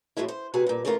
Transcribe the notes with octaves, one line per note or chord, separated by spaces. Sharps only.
F#2 A2 F3 F#3 G#3 E4
C5
C3 F#4 G#4 B4 F#5
G2 A#2
C#3 E3 A3 F4 F#4 A#4